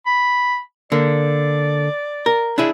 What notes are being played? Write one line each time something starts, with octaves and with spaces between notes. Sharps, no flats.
B5
D3 A#3 D5
A#4
D4 E4 G#4